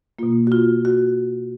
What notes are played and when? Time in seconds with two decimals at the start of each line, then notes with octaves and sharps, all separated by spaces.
0.19 B2 A#3 F4
0.47 F#4
0.52 F4
0.85 F#4